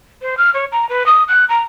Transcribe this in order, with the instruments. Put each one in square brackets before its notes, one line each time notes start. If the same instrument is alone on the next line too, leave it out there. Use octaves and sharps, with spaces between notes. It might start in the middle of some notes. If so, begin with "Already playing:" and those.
[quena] C5
F6
C#5
A#5
B4
D#6
F#6
A#5